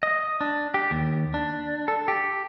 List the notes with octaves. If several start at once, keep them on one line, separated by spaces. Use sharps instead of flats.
D#5
D4
G4
D#2
D4
A4
G4